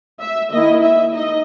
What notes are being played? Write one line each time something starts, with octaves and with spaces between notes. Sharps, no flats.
E5
D#3 A#3 E4 D#5
E5
D#4 D#5